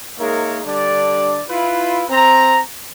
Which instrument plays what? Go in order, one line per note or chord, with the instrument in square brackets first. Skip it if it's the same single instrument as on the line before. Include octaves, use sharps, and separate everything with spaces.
[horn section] G#3 A#3 D#4 A#4 C#5 E5
D3 G3 D4 D5
E4 F4 B4
C4 A#5